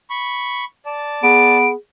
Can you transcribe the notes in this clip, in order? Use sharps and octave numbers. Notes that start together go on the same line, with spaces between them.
B5 C#6
D5 A5
B3 G#4 D7